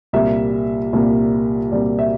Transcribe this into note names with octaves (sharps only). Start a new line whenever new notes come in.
C2 A#2 G3 A#3 E5
C2 A#2 G3 A#3
C2 A#2 G3 A#3 D5
E5